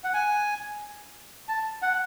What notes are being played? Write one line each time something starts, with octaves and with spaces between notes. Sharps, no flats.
F#5
G#5
A5
F#5